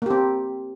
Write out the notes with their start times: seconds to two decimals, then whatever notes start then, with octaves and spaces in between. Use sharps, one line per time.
0.02 A#3
0.06 G4
0.10 C4